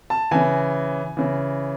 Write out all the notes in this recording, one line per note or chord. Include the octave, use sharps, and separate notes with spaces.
A5
C#3 E3 G#5
C#3 E3